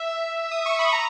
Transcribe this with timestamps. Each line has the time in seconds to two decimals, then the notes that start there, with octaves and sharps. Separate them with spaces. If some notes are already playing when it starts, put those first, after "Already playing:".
Already playing: E5
0.51 D#6
0.66 C#6
0.79 B5
0.93 A#5